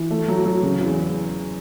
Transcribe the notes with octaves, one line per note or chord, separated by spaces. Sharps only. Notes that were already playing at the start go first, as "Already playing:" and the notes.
Already playing: E3
A3
F#3
F#3
C#3
E2